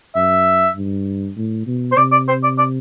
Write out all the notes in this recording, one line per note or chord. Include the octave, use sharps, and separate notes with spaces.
F#2 E5
G2
A2
B2
C5
C3 D5
D5
C5
D5
D5